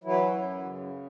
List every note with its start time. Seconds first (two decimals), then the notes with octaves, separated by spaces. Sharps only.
0.04 E3 F#3 E4
0.34 F#2
0.63 C#3